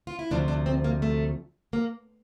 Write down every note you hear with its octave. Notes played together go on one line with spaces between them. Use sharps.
F4
E4
D2 C3 F3 D4
D4
C4
A#3
A3
A#3